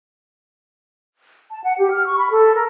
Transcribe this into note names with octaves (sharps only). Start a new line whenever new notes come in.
A5
F#5
G4
F6
C#6
B5
A4
A#4